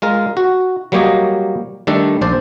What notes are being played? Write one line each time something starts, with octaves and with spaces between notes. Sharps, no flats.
G#3 F4 A#4
F#4
F#3 G3 A#3 G4 C#5 D#5
D#3 G3 A3 D4 A4
A#1 D4 C5 D5